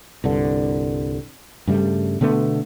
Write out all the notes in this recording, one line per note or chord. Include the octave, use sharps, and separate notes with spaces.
C2 G2 D3
G2 C#3 G3 A3
B2 D3 A3 B3